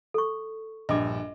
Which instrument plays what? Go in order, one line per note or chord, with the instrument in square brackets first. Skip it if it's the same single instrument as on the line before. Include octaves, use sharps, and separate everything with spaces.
[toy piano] A4 C#6
[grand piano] A#1 G2 [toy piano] D#5 D6